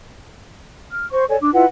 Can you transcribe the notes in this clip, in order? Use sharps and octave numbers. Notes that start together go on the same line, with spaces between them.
F6
C5 C#6
A4 C#5 D5 G#5
D4 D6
E4 F4 B4 F#5